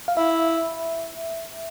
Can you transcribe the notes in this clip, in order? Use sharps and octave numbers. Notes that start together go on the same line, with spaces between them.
F5
E4 E5